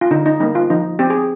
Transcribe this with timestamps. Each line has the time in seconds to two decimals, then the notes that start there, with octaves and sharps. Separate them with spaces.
0.01 F4
0.11 D3 D#4
0.26 D#4
0.40 G3 A#3 D#4
0.55 F4
0.70 F3 D#4
0.99 C4 G4
1.10 G#4